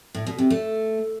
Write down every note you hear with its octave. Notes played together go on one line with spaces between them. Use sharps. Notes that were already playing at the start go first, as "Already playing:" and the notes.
A2
B2
C3
A3